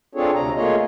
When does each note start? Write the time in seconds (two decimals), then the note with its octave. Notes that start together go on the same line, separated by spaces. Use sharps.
0.15 C4 D4 F4 G#4 A4 C#5
0.35 D2 C3 A#5
0.56 A3 A#3 F4 G#4 C#5 D#5